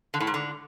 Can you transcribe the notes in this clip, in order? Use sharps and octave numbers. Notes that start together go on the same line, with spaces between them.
D3
A2
G#2
D3